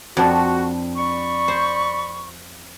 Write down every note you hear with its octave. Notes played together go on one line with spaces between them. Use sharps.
F2 D4 F#4
D5 B5 C#6
C5